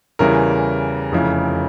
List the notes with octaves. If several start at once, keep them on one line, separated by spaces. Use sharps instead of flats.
E2 C#3 E3 G3 A#4
F1 F2 C#3 E3